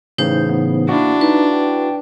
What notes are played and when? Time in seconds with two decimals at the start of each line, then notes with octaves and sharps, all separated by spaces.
0.18 A2 C#3 E3 D#4 C5 G6
0.50 B3
0.89 A#3 D4 E4 F#4
1.21 D#4 B4
1.53 G5